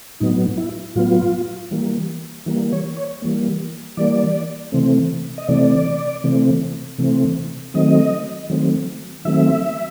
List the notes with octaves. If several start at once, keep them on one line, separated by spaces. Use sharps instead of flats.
A2 F#3 B3 D#4
E4
A2 F#3 B3 F4
E3 G3 A#3
E3 G3 A#3
C#5
C#5
E3 G3 A#3
E3 G3 A#3 D5
C3 E3 A3 C4
D#5
C3 E3 A3 C4 D5
C3 E3 A3 C4
C3 E3 A3 C4
D#3 F#3 A3 C4 D#5
D#3 F#3 A3 C4
D#3 F#3 A3 C4 E5